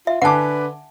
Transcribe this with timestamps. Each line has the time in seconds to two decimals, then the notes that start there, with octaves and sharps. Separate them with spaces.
0.07 F4 E5
0.22 D3 B4 F#5 G#5 A5 D6